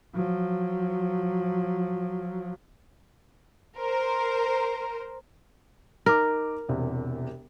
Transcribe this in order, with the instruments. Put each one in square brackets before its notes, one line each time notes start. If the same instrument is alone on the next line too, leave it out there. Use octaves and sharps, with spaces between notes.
[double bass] F3 F#3
[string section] A#4 C5
[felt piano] D#4 D6 [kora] A#4
[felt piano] E1 E2 C3